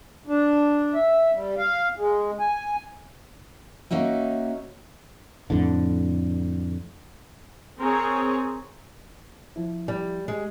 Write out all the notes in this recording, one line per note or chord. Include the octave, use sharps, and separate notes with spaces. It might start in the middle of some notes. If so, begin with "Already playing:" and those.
D4
E5
G3
F5
G#3
G#5
A#3 C#4 D#4 F#4 E5
F2 A2 D3
C4 G#4 A#4 C#5
F3 E4
G3
G#3 G4